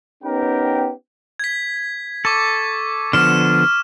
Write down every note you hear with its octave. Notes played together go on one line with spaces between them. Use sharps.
B3 C#4 D#4 G4 A#4 G5
G#6 B6
A4 C#6 D6
D3 F3 B3 F6 E7